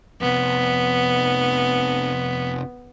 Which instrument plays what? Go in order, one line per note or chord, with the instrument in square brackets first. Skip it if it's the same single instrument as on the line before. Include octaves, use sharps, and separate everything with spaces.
[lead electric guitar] F2 C3 [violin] B3